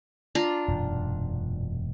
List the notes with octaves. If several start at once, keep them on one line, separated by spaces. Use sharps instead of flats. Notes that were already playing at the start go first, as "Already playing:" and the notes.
D4 F4 A#5
E1 F#2 A#2